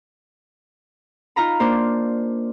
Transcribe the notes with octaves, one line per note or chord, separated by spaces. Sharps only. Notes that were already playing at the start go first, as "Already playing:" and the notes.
D#4 F4 A#5 B5
A#3 D4 C5